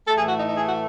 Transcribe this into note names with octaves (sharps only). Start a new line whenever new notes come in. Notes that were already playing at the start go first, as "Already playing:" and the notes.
A2 E3 A3 A4
G#4
F#4
D#4
D#4
G#4
F#4